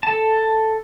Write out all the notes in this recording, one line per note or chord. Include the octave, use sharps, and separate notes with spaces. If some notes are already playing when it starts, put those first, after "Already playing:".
A4 A5